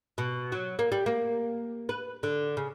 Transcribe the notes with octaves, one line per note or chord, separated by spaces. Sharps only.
B2
F#3
A#3
G3
A#3
B4
D3
C#3